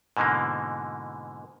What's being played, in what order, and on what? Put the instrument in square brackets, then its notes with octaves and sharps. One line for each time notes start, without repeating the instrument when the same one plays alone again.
[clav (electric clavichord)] G#2 B2 D3 E3 A#3